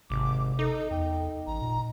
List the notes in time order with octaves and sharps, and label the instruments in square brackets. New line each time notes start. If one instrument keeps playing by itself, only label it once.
[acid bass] G#1 [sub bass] C3 [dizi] D6
[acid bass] D#4 [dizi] A4
[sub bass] E2 [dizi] G5
[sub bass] A1 [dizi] A#5
[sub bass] A#2